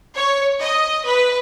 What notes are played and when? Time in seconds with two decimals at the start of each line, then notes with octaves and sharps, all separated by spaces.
0.16 C#5
0.61 D#5
1.06 B4